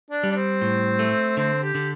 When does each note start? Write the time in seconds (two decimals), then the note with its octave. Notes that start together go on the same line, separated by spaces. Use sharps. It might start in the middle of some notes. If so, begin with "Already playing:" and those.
0.11 D4
0.23 G3
0.32 D4
0.36 C4
0.61 A2
0.99 A3
1.37 D3 C4
1.63 G4
1.75 D3